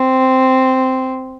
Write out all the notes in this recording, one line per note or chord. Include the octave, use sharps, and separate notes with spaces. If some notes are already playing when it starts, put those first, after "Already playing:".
Already playing: C4